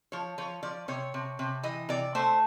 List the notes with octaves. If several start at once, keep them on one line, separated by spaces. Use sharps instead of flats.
F3 C#5
F3 C#5
F3 D5
C3 C#5
C3
C3
E3 D#5
C3 D5
A3 C5